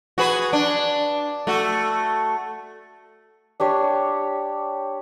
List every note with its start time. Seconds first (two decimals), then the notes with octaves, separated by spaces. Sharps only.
0.18 F#4 G#4 B4
0.53 D4
1.47 A3 F#4
3.60 D4 G4 C#5